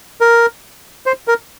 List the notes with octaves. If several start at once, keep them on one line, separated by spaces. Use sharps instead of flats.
A#4
C5
A#4